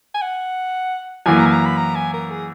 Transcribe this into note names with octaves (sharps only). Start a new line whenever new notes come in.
G#5
F#5
F#2 E3 A#3 G#5
A#5
G#5
A#5
B5
A#5
G#5
A#4
G#4